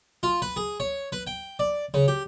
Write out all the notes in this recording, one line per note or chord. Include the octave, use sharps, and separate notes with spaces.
F4
B4
G#4
C#5
B4
G5
D5
C#3
G4